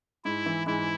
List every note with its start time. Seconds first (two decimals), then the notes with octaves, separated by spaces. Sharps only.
0.25 G#2 E4
0.46 E3
0.66 G#2 E4